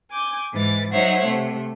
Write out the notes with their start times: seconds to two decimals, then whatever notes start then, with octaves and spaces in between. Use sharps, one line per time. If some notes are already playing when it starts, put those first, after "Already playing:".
0.11 G#5 D6 G6
0.52 G#2 E3 A6
0.91 F#3 D#4 C5 C#5 E5 F#5
1.23 C3 A3